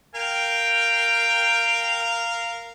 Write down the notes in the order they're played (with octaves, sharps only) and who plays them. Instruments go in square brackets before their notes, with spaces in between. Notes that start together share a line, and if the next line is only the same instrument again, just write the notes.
[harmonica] A#4 F5 [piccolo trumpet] G5